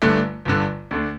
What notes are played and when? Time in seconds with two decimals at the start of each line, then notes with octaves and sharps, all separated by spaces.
0.02 G1 G2 D3 A3
0.45 G1 G2 D3
0.91 D2 D3 A3 D4